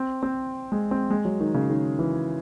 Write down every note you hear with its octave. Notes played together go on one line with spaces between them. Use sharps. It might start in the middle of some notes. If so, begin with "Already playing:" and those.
Already playing: C4
C4
G#3
C4
G#3
F#3
D#3
C#3
D#3
E3